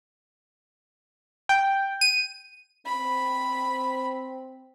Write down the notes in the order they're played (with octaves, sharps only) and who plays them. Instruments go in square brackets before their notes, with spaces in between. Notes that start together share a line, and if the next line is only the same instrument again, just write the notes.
[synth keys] G5
D#7
[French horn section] C4 [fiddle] B5